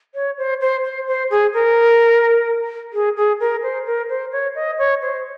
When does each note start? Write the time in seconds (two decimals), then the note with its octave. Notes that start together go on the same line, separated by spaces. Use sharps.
0.15 C#5
0.38 C5
0.61 C5
0.84 C5
1.08 C5
1.31 G#4
1.54 A#4
2.93 G#4
3.17 G#4
3.40 A#4
3.63 C5
3.86 A#4
4.09 C5
4.32 C#5
4.55 D#5
4.78 C#5
5.02 C5